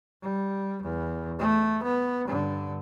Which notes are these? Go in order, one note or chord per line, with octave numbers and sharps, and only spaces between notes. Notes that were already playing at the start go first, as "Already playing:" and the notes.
G3
E2
A3
B3
G2 D3